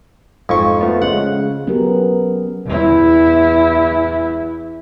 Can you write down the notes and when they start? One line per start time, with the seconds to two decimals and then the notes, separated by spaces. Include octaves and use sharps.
0.49 F2 G#2 C#6
0.81 A3 B3 F4
1.02 C#3 G#3 F#5
1.67 F#3 B3 C#4 G4 G#4 A#4
2.65 E2 E4